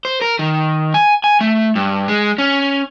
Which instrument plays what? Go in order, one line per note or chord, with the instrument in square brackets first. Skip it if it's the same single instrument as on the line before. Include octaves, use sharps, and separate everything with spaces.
[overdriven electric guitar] C5
A#4
D#3
G#5
G#5
A3
G2
G#3
C#4